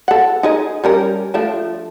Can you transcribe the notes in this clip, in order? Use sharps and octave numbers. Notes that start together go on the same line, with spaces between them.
A4 F#5
D#4 G#4 D#5
G3 C#4 A#4
F3 A3 D4